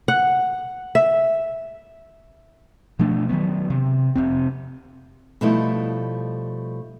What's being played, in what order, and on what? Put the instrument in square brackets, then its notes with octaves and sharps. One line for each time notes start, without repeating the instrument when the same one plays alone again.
[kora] F#5
E5
[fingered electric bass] B2 F3 A3 D4
D#3 F#3 B3
C3
F1 B1 C3 C4
[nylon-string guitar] B2 F3 G3 A3 D#4 E4